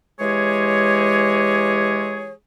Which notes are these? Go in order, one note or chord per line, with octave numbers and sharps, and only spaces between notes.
E3 G#3 G4 G#4 C#5